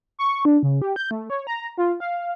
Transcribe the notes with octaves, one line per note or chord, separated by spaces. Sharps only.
C#6
D4
C#3
G4
G6
A3
C#5
A#5
F4
F5